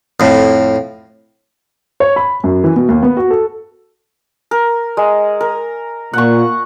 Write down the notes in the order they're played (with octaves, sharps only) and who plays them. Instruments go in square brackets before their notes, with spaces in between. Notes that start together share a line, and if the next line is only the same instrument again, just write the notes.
[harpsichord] F2 A2
[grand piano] C#5
B5
F#2
E3
B2
D#2
B3
F#4
A4
[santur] A#4
G#3
A#4
[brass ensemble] A#2 [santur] F#5 C#6